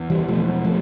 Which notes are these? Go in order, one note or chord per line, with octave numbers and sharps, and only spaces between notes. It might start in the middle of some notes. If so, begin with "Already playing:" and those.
Already playing: E2
E3 G3
E2 B2 F3 A3
F3 A3